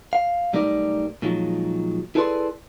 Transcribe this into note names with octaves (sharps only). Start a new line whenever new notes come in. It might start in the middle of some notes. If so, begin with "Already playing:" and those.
F5
B1 G3 A3 D#4 A#4 D5
A#2 D#3 F3 F#3 G#3
E4 G#4 A4 B4 D5 C6